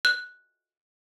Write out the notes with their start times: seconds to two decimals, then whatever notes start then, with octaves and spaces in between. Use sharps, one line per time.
0.05 F#6